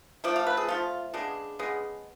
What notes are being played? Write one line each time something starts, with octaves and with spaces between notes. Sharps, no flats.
F3 A3 D5
F5
B4
G#4
F3 A3 F4
C#3 G#3 B3 D4
C#3 G#3 B3